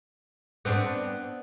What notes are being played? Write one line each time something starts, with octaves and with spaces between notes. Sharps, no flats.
B3 C4 D4